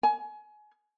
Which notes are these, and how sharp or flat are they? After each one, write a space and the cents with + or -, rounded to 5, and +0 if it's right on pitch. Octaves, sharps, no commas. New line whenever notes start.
G#5 +25